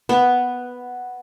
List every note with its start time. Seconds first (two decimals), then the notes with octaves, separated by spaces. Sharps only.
0.09 B3